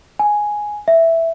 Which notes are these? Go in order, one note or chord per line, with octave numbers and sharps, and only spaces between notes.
G#5
E5